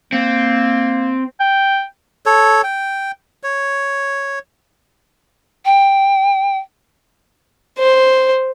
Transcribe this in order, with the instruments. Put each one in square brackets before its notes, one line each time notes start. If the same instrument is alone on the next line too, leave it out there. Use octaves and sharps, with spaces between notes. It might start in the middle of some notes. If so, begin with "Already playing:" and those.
[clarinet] A#3 [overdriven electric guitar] C4
[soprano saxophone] G5
[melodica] A4 C#5
G5
C#5
[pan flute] G5
[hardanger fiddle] C5